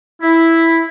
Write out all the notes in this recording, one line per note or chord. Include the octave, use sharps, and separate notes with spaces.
E4